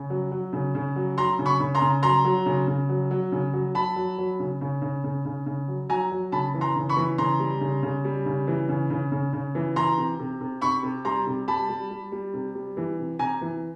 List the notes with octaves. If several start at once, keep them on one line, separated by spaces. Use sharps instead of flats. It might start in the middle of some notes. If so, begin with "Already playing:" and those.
Already playing: C#3
F#3
F#3
C#3
C#3
F#3
F#3 A#5 C6
C#3
B5 C#6
C#3
A#5 C6
C#3
F#3 A#5 C6
F#3
C#3
C#3
F#3
F#3
C#3
F#3
F#3 A5 B5
F#3
F#3
C#3
C#3
C#3
C#3
C#3
C#3
F#3
F#3 G#5 A#5
F#3
C#3 A5 B5
E3
A#5 C6
C#3
B5 C#6
E3
C#3 A#5 C6
G3
C#3
C#3
G3
C#3
E3
C#3
C#3
C#3
C#3
E3
E3 A#5 C6
C3
C3
C3
C3 B5 C#6
C3
G3 A#5 C6
C3
G3 A5 B5
G3
G3
G3
C3
G3
E3
C3
C3 G#5 A#5
E3